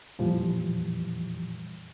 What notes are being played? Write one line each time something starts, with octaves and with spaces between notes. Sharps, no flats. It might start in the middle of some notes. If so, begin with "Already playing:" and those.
F2 A#2 E3 F3 G3